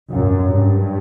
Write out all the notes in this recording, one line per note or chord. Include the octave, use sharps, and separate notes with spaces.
F#2
G2